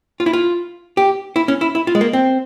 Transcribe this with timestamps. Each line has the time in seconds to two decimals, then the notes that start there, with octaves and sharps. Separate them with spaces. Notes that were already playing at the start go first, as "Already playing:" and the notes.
0.20 F4
0.26 E4
0.33 F4
0.97 G4
1.36 E4
1.48 C#4
1.61 E4
1.75 E4
1.87 F4
1.95 G#3
2.01 A#3
2.13 C4